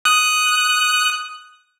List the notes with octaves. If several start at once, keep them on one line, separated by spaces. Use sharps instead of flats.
D#6 F#6